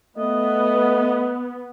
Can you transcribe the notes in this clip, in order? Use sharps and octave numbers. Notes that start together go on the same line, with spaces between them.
A3 B3 D#5